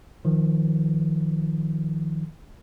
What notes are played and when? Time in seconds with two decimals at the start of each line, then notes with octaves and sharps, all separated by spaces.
0.25 D#3 F3